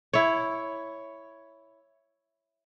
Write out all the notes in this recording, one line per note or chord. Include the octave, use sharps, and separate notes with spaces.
E4 C#5